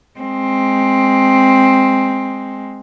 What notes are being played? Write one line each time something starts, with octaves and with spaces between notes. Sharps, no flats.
G#3 C4